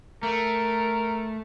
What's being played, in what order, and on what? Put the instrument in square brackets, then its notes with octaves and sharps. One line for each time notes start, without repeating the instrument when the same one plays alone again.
[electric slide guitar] A3 [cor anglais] A#4